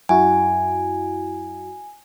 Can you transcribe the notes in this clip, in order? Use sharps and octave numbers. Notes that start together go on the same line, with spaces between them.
F#2 E4 F#4 G#5